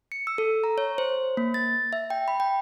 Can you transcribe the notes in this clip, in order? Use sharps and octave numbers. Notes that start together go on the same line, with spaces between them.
C#7
E6
A4
A#5
C#5
C5
A#3
A6
E5
G5
B5
G5